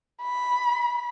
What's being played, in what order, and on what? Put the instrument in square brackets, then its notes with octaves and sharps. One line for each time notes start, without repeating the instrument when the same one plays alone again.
[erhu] B5